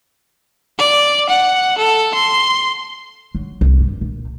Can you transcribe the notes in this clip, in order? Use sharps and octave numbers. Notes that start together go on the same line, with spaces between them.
D5
F#5
A4
C6
F#3
C2
G2
A#2